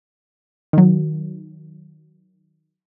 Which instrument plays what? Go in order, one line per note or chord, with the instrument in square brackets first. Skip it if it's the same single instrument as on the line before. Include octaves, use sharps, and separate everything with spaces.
[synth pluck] D#3 F#3